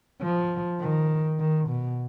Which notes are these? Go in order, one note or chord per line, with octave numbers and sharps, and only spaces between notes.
F3
D#3
D#3
B2